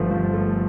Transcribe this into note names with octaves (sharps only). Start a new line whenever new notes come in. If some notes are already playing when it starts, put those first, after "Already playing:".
Already playing: G1 F3 A3
F3
A3